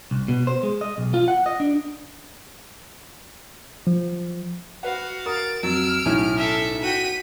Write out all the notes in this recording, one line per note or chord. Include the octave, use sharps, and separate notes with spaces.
C2
B2
C5
G#3
D#5
B1
F4
F#5
D#5
D4
F3
F#4 B4 F5 F#5
A#4 D#6 A6 D7
F2 F#3 E6 F6 D7
B1 A2 C#4 E4
A4 E5
F#4 G5 B6 D#7